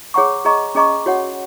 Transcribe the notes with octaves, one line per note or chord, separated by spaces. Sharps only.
G#4 C#5 F#5 A#5 C#6
G#4 D#5 A#5 C#6
C#4 G#4 D#5 A#5 C#6
F#4 C#5 F#5